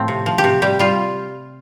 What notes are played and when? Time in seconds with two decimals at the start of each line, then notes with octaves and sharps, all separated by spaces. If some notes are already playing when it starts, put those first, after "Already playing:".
Already playing: A2 F3 A3 C4
0.08 C3
0.26 F3
0.38 G4
0.44 C3
0.62 G3 G4
0.79 G3 F4